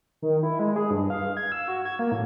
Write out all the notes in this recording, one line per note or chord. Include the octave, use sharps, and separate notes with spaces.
D#3
E4
G#3
G#4
G2
F5
G#6
E6
F#4
G#6
A#3
A2